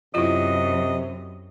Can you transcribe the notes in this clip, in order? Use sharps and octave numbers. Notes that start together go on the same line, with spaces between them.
F#2 C3 E4 F4 D#5